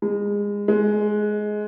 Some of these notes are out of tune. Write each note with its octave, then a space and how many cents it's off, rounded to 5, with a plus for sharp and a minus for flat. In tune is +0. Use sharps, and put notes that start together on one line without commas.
G#3 -25
G#3 +15